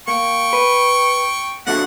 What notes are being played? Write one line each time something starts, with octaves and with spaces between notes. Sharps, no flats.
A#3 G5 C#6
B4
A#2 D3 F#4 F#5